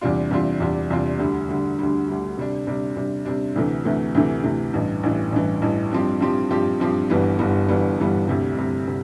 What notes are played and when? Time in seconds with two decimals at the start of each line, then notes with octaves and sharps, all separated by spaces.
0.01 E2 C3 G3 D4 F4
0.31 E2 C3 G3 D4 F4
0.60 E2 C3 G3 D4 F4
0.90 E2 C3 G3 D4 F4
1.19 D2 D3 G3
1.49 D2 D3 G3
1.79 D2 D3 G3
2.08 D2 D3 G3
2.37 C3 G3 D4
2.67 C3 G3 D4
2.97 C3 G3 D4
3.25 C3 G3 D4
3.56 D2 C3 E3 A3
3.85 D2 C3 E3 A3
4.15 D2 C3 E3 A3
4.44 D2 C3 E3 A3
4.73 A1 G2 E3
5.03 A1 G2 E3
5.32 A1 G2 E3
5.62 A1 G2 E3
5.92 G2 F3 C4 G4
6.21 G2 F3 C4 G4
6.51 G2 F3 C4 G4
6.80 G2 F3 C4 G4
7.10 G1 G2 E3 G3 B3
7.39 G1 G2 E3 G3 B3
7.69 G1 G2 E3 G3 B3
7.98 G1 G2 E3 G3 B3
8.28 D2 C3 G3
8.57 D2 C3 G3
8.88 C3